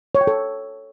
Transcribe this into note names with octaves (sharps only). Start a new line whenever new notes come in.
C#5
G5
A4